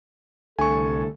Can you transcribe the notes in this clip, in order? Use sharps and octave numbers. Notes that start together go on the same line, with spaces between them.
C2 D3 A3 A4 G#5 C#6